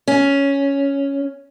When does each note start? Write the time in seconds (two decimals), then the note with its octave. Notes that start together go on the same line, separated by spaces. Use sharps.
0.08 C#4